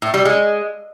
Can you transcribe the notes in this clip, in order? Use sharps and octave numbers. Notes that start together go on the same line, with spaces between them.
A2
G3
G#3